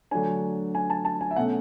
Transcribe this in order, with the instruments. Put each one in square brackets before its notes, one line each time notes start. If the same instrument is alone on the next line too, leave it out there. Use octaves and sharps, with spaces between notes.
[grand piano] D3 F#3 A3 D4 G#5
G#5
A5
A5
G#5
E5
B2 A3 C#4 F#5